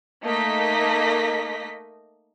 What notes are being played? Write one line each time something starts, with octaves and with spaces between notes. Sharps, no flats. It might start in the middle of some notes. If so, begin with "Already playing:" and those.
A3 A#3 D#4 D#5 B6